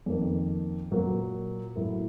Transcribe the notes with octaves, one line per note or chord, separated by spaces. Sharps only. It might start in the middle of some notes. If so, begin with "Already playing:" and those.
F2 D#3 A#3
A#2 F#3 A#3
A2 F#3 A#3